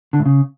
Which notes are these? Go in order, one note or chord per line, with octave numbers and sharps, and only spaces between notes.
D3
A2
C#3